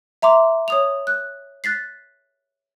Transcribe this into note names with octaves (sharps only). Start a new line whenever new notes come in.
E5 A#5 C6 D6
C#5 D#6 F7
F#6
F#6 A6 B6 C7